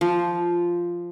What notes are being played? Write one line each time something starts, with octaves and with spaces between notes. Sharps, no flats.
F3